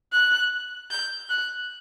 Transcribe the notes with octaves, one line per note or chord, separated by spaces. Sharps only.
F#6
G6
F#6